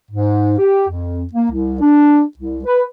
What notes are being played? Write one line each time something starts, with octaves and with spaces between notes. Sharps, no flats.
G#2
G4
F2
A#3
C2
D4
C2
B4